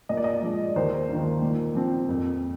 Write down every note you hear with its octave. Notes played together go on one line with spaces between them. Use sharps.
A#2 D#5
D5
D#5
F3 G#3
D#2 C5
D#3 A#3
A#2
F3 C4
F2